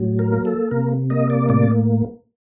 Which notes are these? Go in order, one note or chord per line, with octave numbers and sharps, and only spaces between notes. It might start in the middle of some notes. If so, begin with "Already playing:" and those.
Already playing: A2 F#3
A#4
A#3
A4
C3 A#4
A#3 D#5
D5
A2 D5